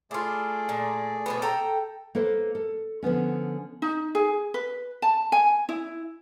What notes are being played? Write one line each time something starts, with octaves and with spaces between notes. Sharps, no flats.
A3 E4 F4 G#4 D5
A#2
B2 F3 B3
A4 G5 A#5
A#3 A4 B4 C5
A4
D3 F3 B3 C#4
D#4
G#4
B4
A5
G#5
E4